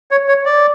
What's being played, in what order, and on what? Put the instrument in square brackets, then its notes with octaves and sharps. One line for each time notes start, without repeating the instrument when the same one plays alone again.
[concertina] C#5
C#5
D5